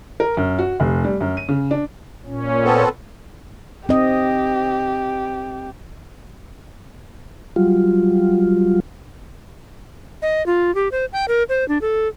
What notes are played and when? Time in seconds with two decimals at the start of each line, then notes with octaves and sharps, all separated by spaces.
0.20 A#4
0.37 F#2
0.59 F#4
0.80 F1
1.04 G3
1.20 F#2
1.37 D#7
1.49 C#3
1.71 D4
2.26 A#2 C#4
2.65 B3 C4 A4
3.89 C4 G4 D#5
7.56 F#3 G3 F4
10.22 D#5
10.46 F4
10.75 G4
10.92 C5
11.13 G5
11.28 A#4
11.49 C5
11.68 D4
11.81 A4